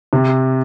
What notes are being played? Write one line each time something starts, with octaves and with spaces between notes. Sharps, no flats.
C3